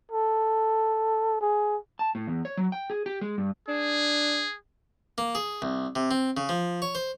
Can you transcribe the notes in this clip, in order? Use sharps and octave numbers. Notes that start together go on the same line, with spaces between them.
A4
G#4
A5
A2
E2
C#5
F#3
G5
G#4
G4
G#3
G2
D4 G#4
A#3
G#4
C2
C3
C4
C#3
F3
C#5
C5